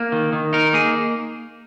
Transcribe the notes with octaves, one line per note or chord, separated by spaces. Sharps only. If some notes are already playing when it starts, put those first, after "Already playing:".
Already playing: A#3
D#3
D#3
D#4 A#4
A#3 G#4